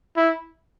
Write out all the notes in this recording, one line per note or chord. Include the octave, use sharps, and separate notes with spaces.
E4